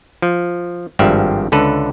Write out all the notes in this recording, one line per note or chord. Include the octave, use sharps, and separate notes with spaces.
F3
G#1 G2 F3 G4 D5 E5
C#2 D3 A4 B4